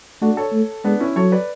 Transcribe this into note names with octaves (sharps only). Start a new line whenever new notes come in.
A3 D4 F#4
A4 C#5
A3
G#3 B3 D4
C#4 E4
F#3 A4 C#5
B4 D5